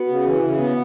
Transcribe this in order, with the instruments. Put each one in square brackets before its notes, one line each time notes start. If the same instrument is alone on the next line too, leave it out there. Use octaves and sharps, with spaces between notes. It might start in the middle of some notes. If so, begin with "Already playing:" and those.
Already playing: [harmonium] B3 [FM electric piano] F#4
[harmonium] C#3
E3
C#3
B3